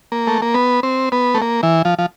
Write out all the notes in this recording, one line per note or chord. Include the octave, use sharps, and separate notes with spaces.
A#3
A3
A#3
B3
C4
B3
A3
A#3
E3
F3
F3